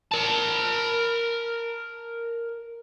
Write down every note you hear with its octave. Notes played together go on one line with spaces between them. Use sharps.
A#4 A5